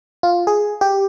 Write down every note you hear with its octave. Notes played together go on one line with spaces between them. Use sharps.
F4
G#4
G4